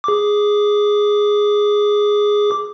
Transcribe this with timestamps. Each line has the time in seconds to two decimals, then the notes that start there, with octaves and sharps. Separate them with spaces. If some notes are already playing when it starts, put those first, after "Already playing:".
0.04 G#4 D6